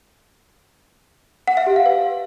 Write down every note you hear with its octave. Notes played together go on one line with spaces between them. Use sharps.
F#5
E5
G4
F5
B4